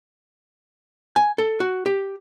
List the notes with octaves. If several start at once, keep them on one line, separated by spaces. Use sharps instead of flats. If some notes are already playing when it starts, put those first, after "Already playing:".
G#5
A4
F#4
G4